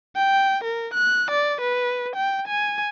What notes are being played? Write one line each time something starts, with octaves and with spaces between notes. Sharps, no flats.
G5
A#4
F#6
D5
B4
G5
G#5